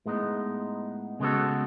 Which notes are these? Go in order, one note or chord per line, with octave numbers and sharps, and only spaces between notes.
A2 G#3 B3 D#4
C#3 G#3 B3 F#4 A4